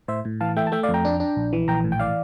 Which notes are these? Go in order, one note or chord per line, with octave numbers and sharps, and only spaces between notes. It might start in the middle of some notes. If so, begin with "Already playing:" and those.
A2 C5 E5
A2
E3 F5 A5
A3 E5 G5
A5
A3 E5 G5
D5 F5
F2
G5 A#5
D4
D4
A#1
E3
A#1 G5 A#5
A2
G5
E3 D5 F5